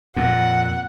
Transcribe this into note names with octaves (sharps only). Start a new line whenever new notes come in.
F2 A#2 F#5